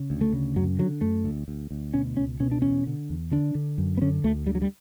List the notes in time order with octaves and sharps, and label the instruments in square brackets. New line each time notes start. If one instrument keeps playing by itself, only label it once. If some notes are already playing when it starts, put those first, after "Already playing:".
Already playing: [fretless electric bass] C#3
D2
A3
C#3
F#2 F#3
D3 F#3
F#2 A3
D2
D2
D2
B2 C#4
C#2 C#4
B2 C#4
D4
E2 C#4
D3
E2
D3 D4
D3
F#2
B3
D3 C#4
D2 A3
D3 G3
F#3
G3